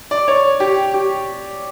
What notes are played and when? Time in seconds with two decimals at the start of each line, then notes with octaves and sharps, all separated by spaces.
0.11 D5
0.28 C#5
0.60 G4
0.94 G4